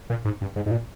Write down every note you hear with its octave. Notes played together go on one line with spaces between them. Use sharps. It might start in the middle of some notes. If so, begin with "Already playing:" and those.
A#2
G#2
G2
G#2
G#2
A#2